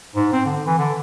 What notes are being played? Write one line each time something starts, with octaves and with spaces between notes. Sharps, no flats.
G#2
C4
D3
E3
D3